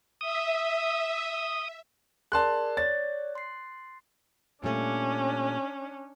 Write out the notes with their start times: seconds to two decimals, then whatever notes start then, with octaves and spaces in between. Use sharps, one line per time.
0.21 E5 D#6
2.32 G#4 A#4 D5 A5 C6 F#6
2.77 C#5 D5 A6
3.35 C6 C7
4.64 A#2 G3 A3 C#4 D4